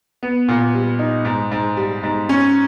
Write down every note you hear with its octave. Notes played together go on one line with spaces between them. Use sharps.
B3
A#2
G3
D#4
G#2
G#2
G3
G#2
C#4